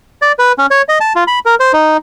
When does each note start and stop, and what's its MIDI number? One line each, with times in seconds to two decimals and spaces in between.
0.22 0.32 74
0.39 0.52 71
0.58 0.66 61
0.71 0.82 73
0.89 0.99 75
1.01 1.13 81
1.16 1.24 65
1.27 1.39 83
1.46 1.55 70
1.60 1.72 72
1.73 1.97 63